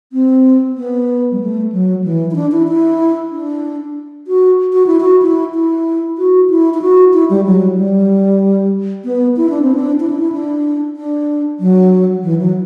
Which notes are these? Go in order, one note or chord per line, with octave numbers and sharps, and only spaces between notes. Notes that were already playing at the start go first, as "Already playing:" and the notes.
C4
B3
G3
A3
F#3
E3
E4
D4
E4
E4
D4
F#4
F#4
E4
F#4
E4
E4
F#4
E4
E4
F#4
E4
G3
F#3
G3
B3
E4
D4
C4
D4
E4
D4
E4
D4
D4
F#3
E3
F#3